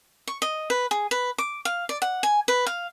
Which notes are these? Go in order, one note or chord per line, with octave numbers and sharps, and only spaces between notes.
C#6
D#5
B4
G#4
B4
D6
F5
D5
F#5
G#5
B4
F5